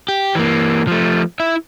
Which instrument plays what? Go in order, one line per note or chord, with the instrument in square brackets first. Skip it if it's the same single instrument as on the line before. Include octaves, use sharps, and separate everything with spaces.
[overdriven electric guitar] G4
E3 A#3
F3 A3
E4 E5